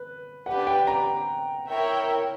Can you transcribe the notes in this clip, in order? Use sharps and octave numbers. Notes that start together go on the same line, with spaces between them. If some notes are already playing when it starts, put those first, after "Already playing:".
Already playing: B4
D4 G4 B4 F#5
G5
A#5
E4 A#4 C#5 E5 G5